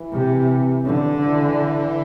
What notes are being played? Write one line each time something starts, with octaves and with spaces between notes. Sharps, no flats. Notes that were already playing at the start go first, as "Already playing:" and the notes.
Already playing: E3
C3
D3
E3